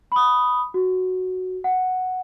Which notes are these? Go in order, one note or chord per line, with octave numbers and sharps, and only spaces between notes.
B5 D#6
F#4
F#5